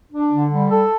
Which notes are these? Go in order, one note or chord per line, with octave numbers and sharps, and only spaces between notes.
D4
D3
G3
A4